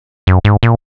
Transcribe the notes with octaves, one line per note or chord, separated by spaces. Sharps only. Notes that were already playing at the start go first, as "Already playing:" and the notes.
F#2
G#2
A#2